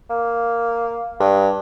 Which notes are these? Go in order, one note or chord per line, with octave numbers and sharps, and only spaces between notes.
A#3
G2